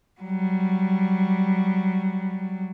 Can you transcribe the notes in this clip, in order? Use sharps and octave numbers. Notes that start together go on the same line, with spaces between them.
F#3 G3